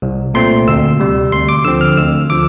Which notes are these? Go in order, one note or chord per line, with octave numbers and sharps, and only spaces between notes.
C2
A#2 A3 C4 C6
D2 E6
C3 G3
D2 C6
D6
D3 F3 C4 E6
F6
D2 E6
D3 F3 D6